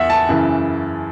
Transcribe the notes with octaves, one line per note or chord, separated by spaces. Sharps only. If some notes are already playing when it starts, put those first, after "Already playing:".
Already playing: E2 E5 F#5
A5
F#2 C#3 E3